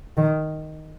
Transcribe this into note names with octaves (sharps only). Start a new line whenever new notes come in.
D#3